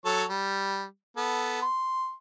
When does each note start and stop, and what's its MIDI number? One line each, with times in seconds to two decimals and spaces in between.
0.05 0.24 54
0.05 0.24 69
0.05 0.24 73
0.29 0.84 55
1.17 1.62 59
1.17 1.62 69
1.62 2.13 84